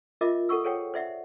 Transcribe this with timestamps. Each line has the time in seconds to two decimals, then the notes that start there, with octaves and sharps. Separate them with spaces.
0.21 F4 A#4 D#5 E5 D6
0.49 A4 F#5 C#6 E6
0.64 G#4 A4 C5 C#5 F#5 G5
0.94 C5 D5 E5 F#5